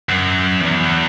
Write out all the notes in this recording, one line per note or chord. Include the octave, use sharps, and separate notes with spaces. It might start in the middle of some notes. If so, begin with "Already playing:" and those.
F#2
E2